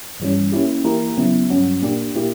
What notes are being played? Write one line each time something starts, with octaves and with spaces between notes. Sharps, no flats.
G2 E3 G3 C#4
A#3 C#4 E4 G4
E3 A#3 E4 G4 A#4
C#3 F#3 B3 E4
G2 F#3 C#4 F#4
A#2 A#3 D4 G4
A#2 A#3 E4 G4